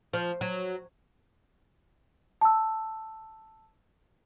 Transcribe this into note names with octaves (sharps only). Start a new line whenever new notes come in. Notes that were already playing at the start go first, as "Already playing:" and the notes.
F3
F#3
A5 E6